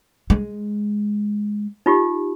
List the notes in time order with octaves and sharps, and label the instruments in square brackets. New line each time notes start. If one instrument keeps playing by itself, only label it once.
[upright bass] G#3
[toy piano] D#4 F4 G4